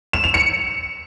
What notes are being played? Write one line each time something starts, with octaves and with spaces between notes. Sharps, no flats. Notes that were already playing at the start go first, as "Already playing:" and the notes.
E7
F7
C#7